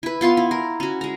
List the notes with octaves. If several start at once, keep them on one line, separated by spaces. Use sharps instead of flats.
E4 B4
B3 F4 F5 C6
E4
A#4
C#4 F#4
G#3 A#5